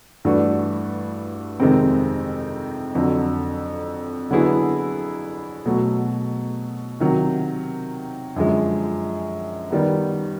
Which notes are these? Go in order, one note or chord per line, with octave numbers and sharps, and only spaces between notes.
G2 E3 A3 D4 F#4
F2 C3 D#3 G#3 C4
F2 D3 F#3
D3 F#3 B3 E4 G#4
B2 F#3 A3
C3 D#3 F#3
F#2 D3 F3 G#3
D#3 G3 B3